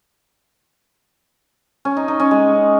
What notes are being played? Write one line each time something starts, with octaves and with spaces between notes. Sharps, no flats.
C#4
D#4
D#4
C#4
G#3